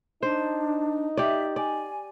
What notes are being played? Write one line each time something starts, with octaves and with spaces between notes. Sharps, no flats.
D4 D#4 C5
G4 D5 E5
D5 G#5